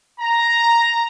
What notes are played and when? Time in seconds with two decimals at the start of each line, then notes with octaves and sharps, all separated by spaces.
0.19 A#5